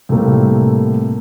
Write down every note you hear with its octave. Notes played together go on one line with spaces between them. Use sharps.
A2 C3 G3 A3 A#3